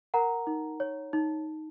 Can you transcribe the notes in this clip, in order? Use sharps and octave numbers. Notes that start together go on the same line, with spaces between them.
A#4 F#5 A#5
D#4
C#5
D#4